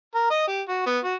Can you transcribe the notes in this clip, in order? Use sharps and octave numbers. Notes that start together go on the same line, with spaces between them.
A#4
D#5
G4
F#4
B3
F#4